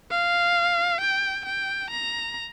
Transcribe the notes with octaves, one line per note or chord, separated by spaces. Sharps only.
F5
G5
G5
A#5